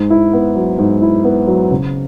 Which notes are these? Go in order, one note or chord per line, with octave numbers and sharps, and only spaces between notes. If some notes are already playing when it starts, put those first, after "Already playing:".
Already playing: G#2
E4
B3
F#3
G#2
E4
B3
F#3
C#3